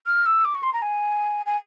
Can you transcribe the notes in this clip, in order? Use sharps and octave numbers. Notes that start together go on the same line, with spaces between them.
F6
E6
D6
C#6
C6
A#5
G#5
G#5